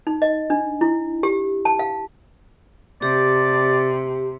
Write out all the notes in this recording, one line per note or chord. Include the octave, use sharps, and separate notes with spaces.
D#4
D#5
D4
E4
G4
A5
F5
C3 G4 D5